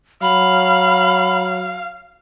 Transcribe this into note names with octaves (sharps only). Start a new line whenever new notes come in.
F#3 F5 B5